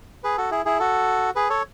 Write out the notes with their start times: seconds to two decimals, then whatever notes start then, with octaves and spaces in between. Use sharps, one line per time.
0.24 G#4 B4
0.38 F#4 A4
0.51 E4 G#4
0.65 E4 G#4
0.79 F#4 A4
1.35 G#4 B4
1.49 A4 C#5